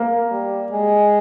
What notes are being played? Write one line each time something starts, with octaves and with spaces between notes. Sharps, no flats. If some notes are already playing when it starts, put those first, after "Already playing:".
Already playing: A#3
G3
G#3